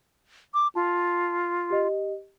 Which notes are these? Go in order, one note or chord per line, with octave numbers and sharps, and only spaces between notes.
D6
F4 A5
G4 D#5